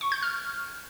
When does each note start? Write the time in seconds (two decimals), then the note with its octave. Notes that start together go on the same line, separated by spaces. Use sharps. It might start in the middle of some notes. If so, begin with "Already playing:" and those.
0.01 C#6
0.12 G6
0.23 F6